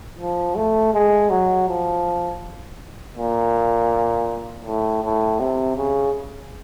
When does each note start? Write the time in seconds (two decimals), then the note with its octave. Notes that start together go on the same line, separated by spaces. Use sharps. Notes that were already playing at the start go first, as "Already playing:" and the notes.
0.19 F3
0.56 A3
0.94 G#3
1.30 F#3
1.68 F3
3.17 A#2
4.65 A2
5.03 A2
5.40 C3
5.77 C#3